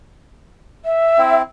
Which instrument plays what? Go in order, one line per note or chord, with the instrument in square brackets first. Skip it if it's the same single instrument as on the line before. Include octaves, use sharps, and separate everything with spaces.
[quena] E5
[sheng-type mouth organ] C4 E4